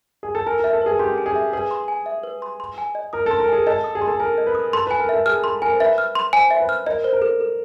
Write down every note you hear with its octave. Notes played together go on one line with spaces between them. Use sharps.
G#4
A4
A#4 G#5
A#4 E5
A4
G#4 B4
G4 C6
G#5
G#4
E5
G#4 B4
C6
G#5
E5
B4
C6
C6
G#5
D#5
A#4 D#6
A4 C6
A#4
G#4 G#5
A4 D#5
D#6
G#4
C6
A4
A#4 G#5
D#5
B4
D#6
A4 C6
B4 G#5
A#4
A4 E5
G#4 F6
A4 C6
A#4 G#5
C5
B4 E5
F6
C6
C5 G#5
E5
B4
F6
A#4 D#5
C5
A#4
A4
A4